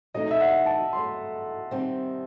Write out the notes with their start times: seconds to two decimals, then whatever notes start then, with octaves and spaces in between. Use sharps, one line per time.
0.14 E2 B2 F#3 A3 D#4 D#5
0.31 E5
0.41 F#5
0.66 A5
0.93 G2 F#3 A3 C6
1.71 C3 D#3 G3 C4